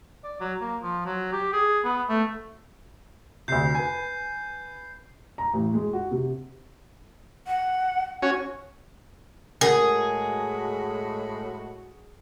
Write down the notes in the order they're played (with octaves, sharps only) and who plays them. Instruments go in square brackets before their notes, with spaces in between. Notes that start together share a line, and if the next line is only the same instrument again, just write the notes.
[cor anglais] D5
F#3
A#3
F3
F#3
G4
G#4
B3
A3
[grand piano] D2 C3 [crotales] G6 C7
[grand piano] B4 G#5
[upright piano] A#5
A1
G#3
F#4
C3
[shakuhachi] F#5
[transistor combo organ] C#4 F#4 C#5
[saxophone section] A2 G#3 F#4 [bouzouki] G#4 [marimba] A#4 F#5